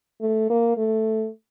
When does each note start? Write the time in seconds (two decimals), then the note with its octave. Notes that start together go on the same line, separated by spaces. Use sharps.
0.21 A3
0.50 A#3
0.77 A3